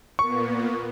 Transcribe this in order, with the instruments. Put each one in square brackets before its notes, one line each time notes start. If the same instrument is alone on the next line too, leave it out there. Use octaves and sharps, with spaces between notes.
[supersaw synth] A#2 A#3 B3 [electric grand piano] C#6